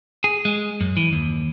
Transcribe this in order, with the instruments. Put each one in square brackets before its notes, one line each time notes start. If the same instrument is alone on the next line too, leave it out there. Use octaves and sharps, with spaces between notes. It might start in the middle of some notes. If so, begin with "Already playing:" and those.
[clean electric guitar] G#4
G#3
F#2
E3
D#2